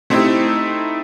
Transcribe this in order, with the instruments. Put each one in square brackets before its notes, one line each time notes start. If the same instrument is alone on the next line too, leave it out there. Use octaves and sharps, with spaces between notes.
[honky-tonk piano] A3 C4 D#4 E4 G4